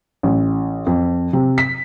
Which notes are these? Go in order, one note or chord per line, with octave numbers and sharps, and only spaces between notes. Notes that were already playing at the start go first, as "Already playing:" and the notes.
A1
F2
C3
B6